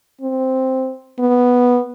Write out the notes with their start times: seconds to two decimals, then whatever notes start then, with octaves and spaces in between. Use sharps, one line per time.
0.21 C4
1.20 B3